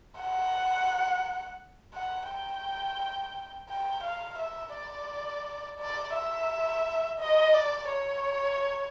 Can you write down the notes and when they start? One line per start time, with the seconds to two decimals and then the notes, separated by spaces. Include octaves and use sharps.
0.19 F#5
1.94 F#5
2.29 G5
3.69 G5
4.04 F5
4.39 E5
4.74 D5
5.79 D5
6.14 E5
7.19 D#5
7.54 D5
7.89 C#5